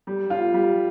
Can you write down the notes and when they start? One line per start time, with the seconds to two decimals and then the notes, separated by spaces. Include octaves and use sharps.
0.07 G3
0.30 F4
0.54 G3